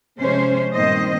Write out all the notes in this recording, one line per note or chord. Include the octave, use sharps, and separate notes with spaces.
C3 F3 G#3 C#4 C5
G2 A#2 D#3 C4 C5 D#5